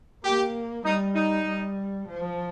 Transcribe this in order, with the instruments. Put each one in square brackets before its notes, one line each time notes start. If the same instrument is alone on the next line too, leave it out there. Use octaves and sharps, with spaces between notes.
[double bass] A#3 [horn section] G4
[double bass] G3 [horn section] D#4
[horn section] D#4
[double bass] G3
F3